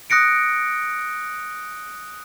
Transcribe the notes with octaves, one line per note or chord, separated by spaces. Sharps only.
D#6 F#6 A#6 C#7 D7